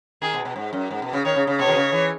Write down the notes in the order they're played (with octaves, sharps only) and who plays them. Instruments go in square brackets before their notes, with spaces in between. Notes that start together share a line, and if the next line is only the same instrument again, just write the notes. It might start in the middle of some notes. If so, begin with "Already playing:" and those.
[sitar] D#3 [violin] G#4
[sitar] B2
B2
G#2
F#2
G#2
B2
C#3
[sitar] D#3 [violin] C#5
[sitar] C#3
C#3
[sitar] B2 [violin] C#5
[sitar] D#3
C#3
E3